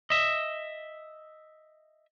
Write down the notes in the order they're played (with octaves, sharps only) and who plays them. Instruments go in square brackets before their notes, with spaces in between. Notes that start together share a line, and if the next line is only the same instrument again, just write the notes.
[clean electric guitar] D#5 E5